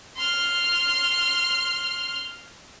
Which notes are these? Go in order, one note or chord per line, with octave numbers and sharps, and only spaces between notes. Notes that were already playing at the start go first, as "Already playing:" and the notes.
C6 F6